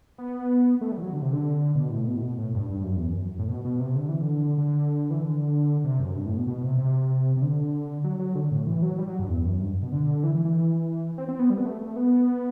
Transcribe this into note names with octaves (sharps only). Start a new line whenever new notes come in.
B3
A3
G3
E3
F#3
D3
C3
D3
B2
A2
B2
A2
B2
A2
G2
G2
F#2
E2
F#2
A2
B2
B2
C3
D3
E3
D3
D3
E3
D3
C3
F#2
G2
A2
B2
B2
C3
C3
C3
D3
F#3
F#3
D3
A2
E3
F#3
G3
F#3
G2
E2
F#2
G2
B2
D3
E3
E3
E3
C4
C4
B3
G3
B3
A3
A3
B3